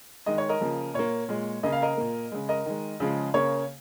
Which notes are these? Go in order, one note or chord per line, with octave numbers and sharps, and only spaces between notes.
D#3 G#3 D#5
C#5
A#4 D#5
C#3 F3 A#3
A#2 A#3 C#5
A#2 G#3
C#3 A#3 D#5
F5
A#4 D#5
A#2 A#3
C#3 G#3
A#4 D#5
D#3 G#3
C#3 F3 G#3
C#3 A#3 C#5